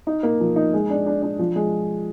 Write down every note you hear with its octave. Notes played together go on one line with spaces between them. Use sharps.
D#4
A#3
F3
D#4
G#3
D4
D4
D4
F3
G#3